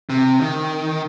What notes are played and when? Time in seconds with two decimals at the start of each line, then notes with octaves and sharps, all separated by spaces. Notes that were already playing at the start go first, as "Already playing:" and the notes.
0.10 C3
0.41 D#3